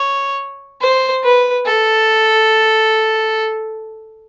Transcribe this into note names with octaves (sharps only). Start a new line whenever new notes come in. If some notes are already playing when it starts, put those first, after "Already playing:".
Already playing: C#5
C5
B4
A4